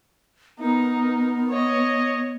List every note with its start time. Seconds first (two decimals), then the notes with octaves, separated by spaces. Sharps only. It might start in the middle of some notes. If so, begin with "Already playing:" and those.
0.59 B3 D#4 A#4
1.49 C#5 D#5